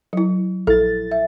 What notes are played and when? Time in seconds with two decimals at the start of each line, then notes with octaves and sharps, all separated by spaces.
0.13 F#3 E4
0.67 A#1 E4 A4 A6
1.11 E5